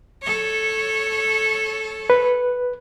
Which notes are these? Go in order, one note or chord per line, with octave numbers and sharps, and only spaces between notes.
A4 C#5
B4